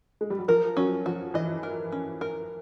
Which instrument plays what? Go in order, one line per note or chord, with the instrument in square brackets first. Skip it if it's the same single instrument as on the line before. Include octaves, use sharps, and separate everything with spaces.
[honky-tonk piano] G#3
G3
F#3
[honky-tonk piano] F3 [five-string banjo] A#4
[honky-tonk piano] F#3 [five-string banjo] C#4
[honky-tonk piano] F3 [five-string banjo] F#4
[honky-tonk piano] E3 [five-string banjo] D#5
[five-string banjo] A#4
C#4
A#4